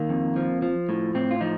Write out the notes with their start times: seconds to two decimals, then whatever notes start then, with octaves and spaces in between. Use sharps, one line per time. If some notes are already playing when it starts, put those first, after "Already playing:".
Already playing: D#3 A#3
0.09 F2
0.36 F3
0.62 F3
0.89 A2
1.15 A2 C4
1.31 F4
1.41 F3 D#4